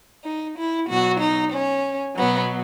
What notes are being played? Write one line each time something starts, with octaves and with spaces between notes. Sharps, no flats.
D#4
E4
B2 F#3 F#4
D#4
C#4
B2 F#3 B3